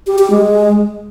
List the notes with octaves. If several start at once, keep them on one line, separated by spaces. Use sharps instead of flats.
G4
G4
G#3